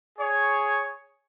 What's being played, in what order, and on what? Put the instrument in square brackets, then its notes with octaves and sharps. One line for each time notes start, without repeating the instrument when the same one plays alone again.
[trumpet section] G#4 C#5